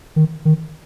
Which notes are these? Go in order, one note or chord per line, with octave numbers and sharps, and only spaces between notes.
D#3
D#3